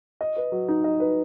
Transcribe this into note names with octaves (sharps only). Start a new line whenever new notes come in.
D#5
B4
F#3
D#4
D#5
B4